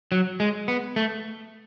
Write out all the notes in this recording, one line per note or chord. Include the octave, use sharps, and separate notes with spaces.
F#3
G#3
B3
A3